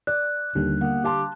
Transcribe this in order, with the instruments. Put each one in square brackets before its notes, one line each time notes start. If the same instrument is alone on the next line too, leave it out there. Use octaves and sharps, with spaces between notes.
[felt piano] D5 [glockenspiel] F#6
[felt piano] D#2 [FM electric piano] D3 G3
[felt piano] A#3 [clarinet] B3
[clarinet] G4 [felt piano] F5 A5 C6